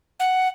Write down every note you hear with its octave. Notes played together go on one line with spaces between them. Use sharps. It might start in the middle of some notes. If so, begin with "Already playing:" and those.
F#5